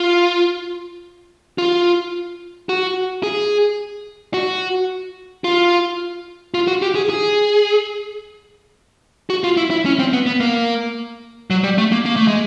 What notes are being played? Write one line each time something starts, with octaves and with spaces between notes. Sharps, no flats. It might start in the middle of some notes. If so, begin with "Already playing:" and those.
Already playing: F4
F4
F#4
G#4
F#4
F4
F4
F#4
G4
G#4
G#4
F#4
F4
E4
E4
C#4
C4
B3
B3
A#3
F#3
G3
A3
A#3
A#3
A3
G#3